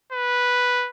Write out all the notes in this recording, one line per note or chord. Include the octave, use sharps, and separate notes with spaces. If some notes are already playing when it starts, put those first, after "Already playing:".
B4